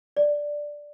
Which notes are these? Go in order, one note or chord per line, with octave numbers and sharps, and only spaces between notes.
D5